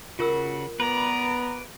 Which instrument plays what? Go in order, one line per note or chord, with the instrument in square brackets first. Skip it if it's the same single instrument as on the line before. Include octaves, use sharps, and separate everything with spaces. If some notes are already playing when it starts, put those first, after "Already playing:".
[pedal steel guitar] C#3 F#4 [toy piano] F4 A#4 E6
[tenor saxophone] B3 [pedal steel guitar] B4 D5 [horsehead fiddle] A#5